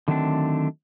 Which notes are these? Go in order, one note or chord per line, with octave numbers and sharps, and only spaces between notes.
D3 D#3 F#3 A3 C4 D4